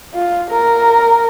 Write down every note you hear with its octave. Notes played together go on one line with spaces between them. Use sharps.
F4
A#4